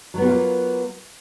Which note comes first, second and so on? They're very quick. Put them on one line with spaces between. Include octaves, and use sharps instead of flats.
F#3 B3 F#4 F4 A#3